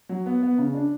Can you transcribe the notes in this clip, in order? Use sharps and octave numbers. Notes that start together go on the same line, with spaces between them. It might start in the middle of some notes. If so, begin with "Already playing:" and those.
F#3
B3
B3
C#3
D4